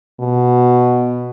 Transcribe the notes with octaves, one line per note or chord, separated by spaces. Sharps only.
B2